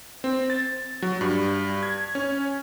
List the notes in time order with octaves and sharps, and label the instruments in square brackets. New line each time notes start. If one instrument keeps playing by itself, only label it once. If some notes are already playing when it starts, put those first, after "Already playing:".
[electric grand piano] C4
A6
F#3
G2
G#6
C#4